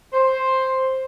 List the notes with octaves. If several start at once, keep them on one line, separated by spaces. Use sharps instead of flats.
C5